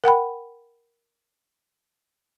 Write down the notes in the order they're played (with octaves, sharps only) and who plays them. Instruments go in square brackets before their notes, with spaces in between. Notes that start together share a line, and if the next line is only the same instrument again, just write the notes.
[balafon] A#4 F#5 G5 B5